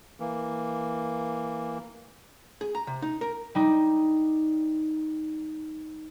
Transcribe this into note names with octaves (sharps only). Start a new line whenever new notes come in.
E3 A#3
G#4
A#5
C3
D#4
A#4
G3 D#4